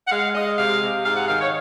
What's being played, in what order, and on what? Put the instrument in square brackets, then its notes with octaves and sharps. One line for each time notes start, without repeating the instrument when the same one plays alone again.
[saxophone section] F#5
G#3 F5
G#3 D#5
C3 F5
C3
G#2 F5
F#5
D#3 F5
C#5